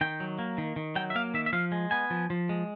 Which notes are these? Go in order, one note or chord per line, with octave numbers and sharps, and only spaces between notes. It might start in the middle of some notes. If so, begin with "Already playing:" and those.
D#3 G5
F#3
A#3
D#3
D#3
F#3 G5
E5
A#3 F5
D#3 E5
E5
F3 F5
G#3
B3 G#5
F3
F3
G#3